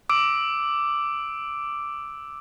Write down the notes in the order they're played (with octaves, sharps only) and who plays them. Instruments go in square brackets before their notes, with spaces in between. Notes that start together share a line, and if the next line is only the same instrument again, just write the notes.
[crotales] D6 E6 D7